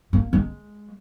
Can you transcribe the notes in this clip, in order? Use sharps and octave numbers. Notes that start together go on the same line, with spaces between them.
A#3
G#3